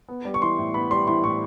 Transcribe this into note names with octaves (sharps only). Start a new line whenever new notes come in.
B3
G3
C#6
E3 C6
A2
B3 B5
G3 C6
E3 C6
A2 C#6